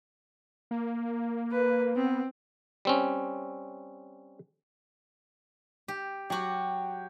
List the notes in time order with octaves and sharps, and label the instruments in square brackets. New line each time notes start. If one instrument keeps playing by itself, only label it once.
[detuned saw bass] A#3
[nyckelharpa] B4
[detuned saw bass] B3 [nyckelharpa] C4
[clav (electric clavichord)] G3 C4 C#4
[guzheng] G4
[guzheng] F#3 F#4 [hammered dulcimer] G4